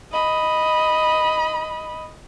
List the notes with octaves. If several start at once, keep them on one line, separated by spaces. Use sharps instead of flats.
D#5 B5